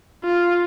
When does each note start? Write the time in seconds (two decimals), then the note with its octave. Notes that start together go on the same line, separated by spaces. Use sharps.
0.24 F4